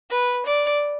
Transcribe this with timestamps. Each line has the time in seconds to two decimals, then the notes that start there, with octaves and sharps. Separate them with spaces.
0.10 B4
0.45 D5